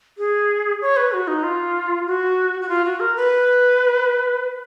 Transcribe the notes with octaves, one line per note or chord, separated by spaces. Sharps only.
G#4
C#5
B4
F#4
D#4
F4
F#4
F#4
F4
F#4
A#4
B4